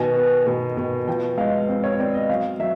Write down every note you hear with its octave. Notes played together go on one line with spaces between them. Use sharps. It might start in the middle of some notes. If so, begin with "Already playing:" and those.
Already playing: B2 D#3 G#5
B3
B2
B2
F3 G5
G#3 F5
C4
C#5
C4 D5
D#5
F#3 F5
F#3 E5